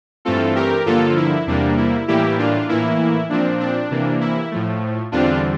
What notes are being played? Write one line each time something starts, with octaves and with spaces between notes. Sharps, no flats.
G2 E3 A3 C4 F4 A4
G4 A#4
G2 D3 F3 A#3 F4 A4
E4
E2 C3 G3 A#3 D4
E4
A2 E3 G3 A#3 E4 G4
D4 F4
A2 E3 A#3 E4
A#2 F3 C4 D4
D4
C3 E3 A#3
E4
A2 F3 A3
E2 D3 G3 C4 D4 F4